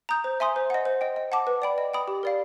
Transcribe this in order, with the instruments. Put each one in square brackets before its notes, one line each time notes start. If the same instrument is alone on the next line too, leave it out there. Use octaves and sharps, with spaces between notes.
[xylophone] A#5 D#6 G6
C5
E5 G#5 C6 D#6
C5
D#5 F#5
C5
D#5 G5
D#5
F#5 A5 D6
B4
D5 G5 B5
D#5
G5 B5 D#6
G4
A#4 D5 F5